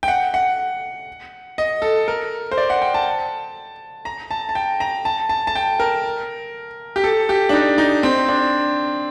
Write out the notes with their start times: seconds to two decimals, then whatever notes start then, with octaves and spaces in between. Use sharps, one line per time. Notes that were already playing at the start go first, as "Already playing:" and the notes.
0.03 G5
0.08 F#5
0.34 F#5
1.58 D#5
1.82 A4
2.08 A#4
2.52 C5
2.57 D5
2.70 F#5
2.82 G5
2.94 A5
4.05 A#5
4.31 A5
4.49 A5
4.55 G5
4.80 A#5
5.05 A5
5.29 A5
5.47 A5
5.55 G5
5.80 A#4
6.96 G4
7.04 A4
7.29 G4
7.49 D4
7.53 D#4
7.78 D#4
8.03 C4
8.28 D4